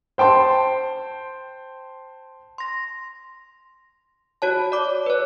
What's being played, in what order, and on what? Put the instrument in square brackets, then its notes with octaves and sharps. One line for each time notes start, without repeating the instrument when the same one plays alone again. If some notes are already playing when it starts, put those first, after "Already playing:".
[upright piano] C5 G5 A5 C6
[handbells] C6 A#6
F#4 C#5 A5
D5 D6
B4 C#5